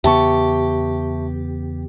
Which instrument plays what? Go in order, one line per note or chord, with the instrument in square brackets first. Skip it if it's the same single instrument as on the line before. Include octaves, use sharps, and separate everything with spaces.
[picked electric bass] E2 C#3 B3 [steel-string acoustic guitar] G4 [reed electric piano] E5 A5 C#6